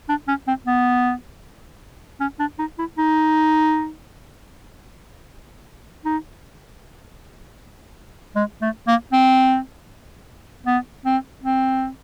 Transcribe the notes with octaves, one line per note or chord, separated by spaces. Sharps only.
D4
C#4
C4
B3
C#4
D4
D#4
E4
D#4
D#4
G#3
A3
A#3
C4
B3
C4
C4